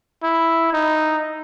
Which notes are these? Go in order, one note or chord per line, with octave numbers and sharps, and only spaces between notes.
E4
D#4